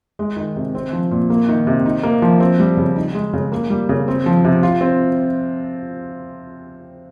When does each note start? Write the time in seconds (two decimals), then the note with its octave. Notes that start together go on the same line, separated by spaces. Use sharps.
0.19 G#3
0.37 D#3
0.56 C3
0.75 C4
0.93 F3
1.11 A#2
1.30 A#3
1.49 D#3
1.67 C3
1.86 D#4
2.03 A#3
2.22 F3
2.40 C4
2.60 G3
2.77 C#3
2.96 D#4
3.15 G#3
3.33 C#3
3.52 A#3
3.70 G3
3.89 C#3
4.08 C4
4.26 F3
4.45 C3
4.63 F4
4.81 C4